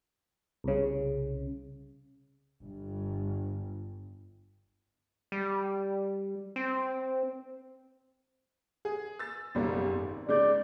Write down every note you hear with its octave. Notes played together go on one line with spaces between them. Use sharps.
C2 C#3
G1 G2
G3
C4
G#4
E6 A6
F#1 B1 G3
G#1
C#3 G#3 D5 G6